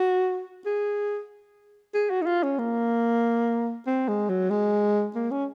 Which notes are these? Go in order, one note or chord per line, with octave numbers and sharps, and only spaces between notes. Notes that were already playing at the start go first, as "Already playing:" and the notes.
Already playing: F#4
G#4
G#4
F#4
D#4
F4
C#4
A#3
C4
G#3
F#3
G#3
A#3
C#4